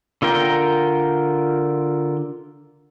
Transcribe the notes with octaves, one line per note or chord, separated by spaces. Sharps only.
D3 F4 A#4 G5